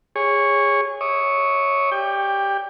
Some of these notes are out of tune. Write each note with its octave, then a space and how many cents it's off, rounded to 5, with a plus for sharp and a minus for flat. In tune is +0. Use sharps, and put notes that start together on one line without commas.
G#4 -20 C#5 +0
C#5 +0 E5 -35 D#6 -45
G4 +0 D5 +0 G5 +20